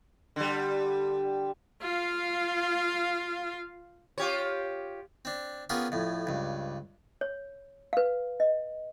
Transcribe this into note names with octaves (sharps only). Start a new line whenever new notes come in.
D3 G3
F4 F5
F4 G4 C#5
C4 D4
B3 C#4 F4 G4 G#4 A#4
F2 A2
C#2 G2
C#5
B4 F5
D#5